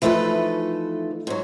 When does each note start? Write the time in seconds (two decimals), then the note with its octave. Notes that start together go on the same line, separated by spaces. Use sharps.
0.02 E3 F3 A3 D#4 A4 B4
1.27 G#2 F#3